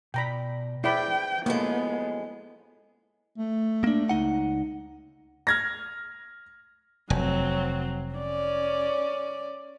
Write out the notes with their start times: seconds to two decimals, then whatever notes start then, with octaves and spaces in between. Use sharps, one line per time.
0.14 B2 D5 G5 A#5 B5
0.84 E4 G#4 B4 C5 D5 G5 B5
1.46 F#2 F3 G#3 A#3 B3 E4 A4 B4
3.38 A3
3.84 A#3 D4
4.09 C#2 D#4 F#5
5.47 F6 G#6 A#6
7.10 F1 F#3 C4
8.15 C#4 D5